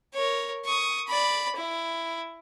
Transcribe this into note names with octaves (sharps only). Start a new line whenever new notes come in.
A#4 C#5
C#6 D#6
D5 B5
E4